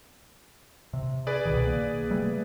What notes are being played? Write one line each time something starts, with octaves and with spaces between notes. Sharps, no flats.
C3
G#4 B4 D5
C2 B2 D#3
A#3
C3 G3 A3